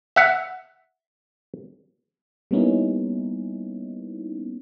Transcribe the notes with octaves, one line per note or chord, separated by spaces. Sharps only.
E5 F#5
G3 A#3 B3 C#4 D#4 E4